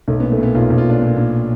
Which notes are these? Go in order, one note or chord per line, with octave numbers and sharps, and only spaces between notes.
B1 A3
B3
A#2
A3
A#2 B3
B1 F4
B1
F4
A#2 D4
A#2
A#2